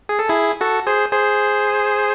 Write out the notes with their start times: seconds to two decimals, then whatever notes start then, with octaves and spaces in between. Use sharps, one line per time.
0.09 G#4
0.19 A4
0.29 E4 G#4
0.61 F#4 A4
0.87 G#4 C5
1.13 G#4 C5